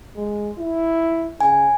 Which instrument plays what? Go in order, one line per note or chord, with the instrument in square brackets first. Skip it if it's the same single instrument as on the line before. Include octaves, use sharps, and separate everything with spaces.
[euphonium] G#3
E4
[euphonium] C#3 [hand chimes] G#5